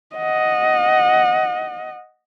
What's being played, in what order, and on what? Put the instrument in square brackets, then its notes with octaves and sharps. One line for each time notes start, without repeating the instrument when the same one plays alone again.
[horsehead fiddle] D#5 F#5